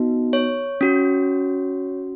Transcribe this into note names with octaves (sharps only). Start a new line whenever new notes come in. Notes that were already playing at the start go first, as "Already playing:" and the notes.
Already playing: B3 D#4 F#4
C#5
C#4 F#4